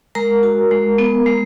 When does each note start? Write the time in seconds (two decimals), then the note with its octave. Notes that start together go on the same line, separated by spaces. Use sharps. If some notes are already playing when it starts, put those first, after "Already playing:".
0.15 G#3 A#4 A#5
0.43 F#4
0.71 G#3
0.98 B3
1.26 G#3